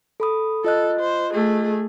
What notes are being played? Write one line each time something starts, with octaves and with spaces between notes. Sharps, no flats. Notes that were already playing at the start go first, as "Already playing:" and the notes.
A4 B5 D#6
F4 A4 D#5 F#6
C5
A3 G#4